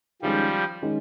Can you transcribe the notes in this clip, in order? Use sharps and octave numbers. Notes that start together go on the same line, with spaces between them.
D#3 F3 G3 G#3 C#4
D#3 G#3 C#4